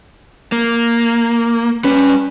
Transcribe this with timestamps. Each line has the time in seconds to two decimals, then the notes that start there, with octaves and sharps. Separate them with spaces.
0.52 A#3
1.84 G3 C#4 B4